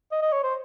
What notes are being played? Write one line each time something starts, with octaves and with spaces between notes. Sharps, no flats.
D#5
D#5
C#5
C5